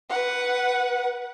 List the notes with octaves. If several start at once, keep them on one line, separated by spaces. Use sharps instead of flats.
B4 F#5